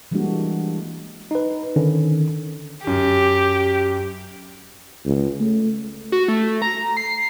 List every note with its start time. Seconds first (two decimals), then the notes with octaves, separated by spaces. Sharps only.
0.11 E3 G3 G#3 A#3 D4 F#4
1.31 D#4 B4
1.76 D3 D#3 C#4
2.87 F#2 G4
5.05 C#2
5.40 A3
6.12 F#4
6.28 A3
6.62 A#5
6.97 C7